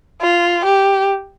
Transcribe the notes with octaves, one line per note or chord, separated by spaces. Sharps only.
F4
G4